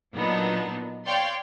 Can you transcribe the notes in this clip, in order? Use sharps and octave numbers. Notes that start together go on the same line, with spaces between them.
A#2 F#3 B3 D4 D#4
C#5 D5 F5 G5 C6